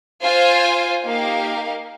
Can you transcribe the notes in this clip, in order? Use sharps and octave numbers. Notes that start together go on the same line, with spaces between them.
F4 C5 F5 G#5
A#3 D#4 G4 A#4 F5